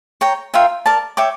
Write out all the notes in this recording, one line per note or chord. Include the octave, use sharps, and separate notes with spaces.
C#5 G5 A#5
F4 A#4 E5 G5
A#4 D5 A5
C#5 E5 G5 D6